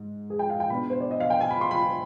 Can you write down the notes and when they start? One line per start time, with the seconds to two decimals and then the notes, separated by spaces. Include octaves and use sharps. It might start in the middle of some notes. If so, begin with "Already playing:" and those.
Already playing: G#2
0.30 G#4
0.39 G5
0.50 F5
0.60 G5
0.70 B2 G#3 B3 D4 B5
0.90 C5
1.00 D5
1.11 D#5
1.20 F5
1.30 G5
1.41 G#5
1.51 B5
1.61 C6
1.71 B5